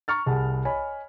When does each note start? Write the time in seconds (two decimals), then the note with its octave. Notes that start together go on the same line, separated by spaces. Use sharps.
0.08 A#5 C#6 F6 A6
0.26 C2 G#4 F#5 A5
0.65 C#5 D#5 G#5 B5